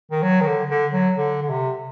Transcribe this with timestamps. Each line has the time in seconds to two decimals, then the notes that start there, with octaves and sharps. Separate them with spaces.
0.11 D#3
0.22 F#3
0.41 D#3
0.46 D3
0.70 D3
0.93 F#3
1.17 D3
1.42 D3
1.49 C3